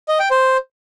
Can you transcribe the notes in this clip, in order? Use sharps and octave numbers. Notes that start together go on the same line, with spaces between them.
D#5
G5
C5